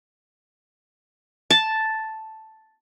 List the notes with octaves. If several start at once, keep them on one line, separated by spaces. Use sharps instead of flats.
A5